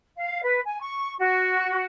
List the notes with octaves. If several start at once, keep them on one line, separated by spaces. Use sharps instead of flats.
F5
B4
G#5
C#6
F#4